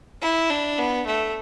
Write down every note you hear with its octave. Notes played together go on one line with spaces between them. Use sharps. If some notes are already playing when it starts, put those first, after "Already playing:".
E4
D4
B3
A3